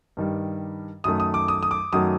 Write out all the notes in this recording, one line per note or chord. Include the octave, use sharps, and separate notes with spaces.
G2 D#3 G3
F#2 D#3 A3 D#6
D#6
D6
D#6
D#6
D6
F#2 D#3 F#3 A3 D#6